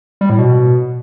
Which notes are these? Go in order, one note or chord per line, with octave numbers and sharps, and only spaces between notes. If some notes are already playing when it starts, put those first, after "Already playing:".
G3
A2
B2